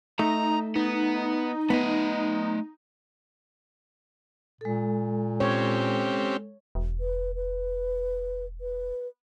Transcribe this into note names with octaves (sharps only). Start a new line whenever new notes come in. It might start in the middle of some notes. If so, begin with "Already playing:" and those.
A3 D#4 A#5
B3 D#4
A3 B3 D#5
A#2 G#3 A4
C4 C#4 G4 C#5
E1
B4
B4
B4